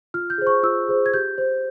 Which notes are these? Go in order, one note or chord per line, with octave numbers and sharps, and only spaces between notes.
F4 F6
G6
G#4 C5
C#6
F4 E6
G#4 C5
G#6
G4 G6
C5